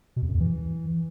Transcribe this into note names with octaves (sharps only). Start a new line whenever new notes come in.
B2
E2
F#2
E2
E3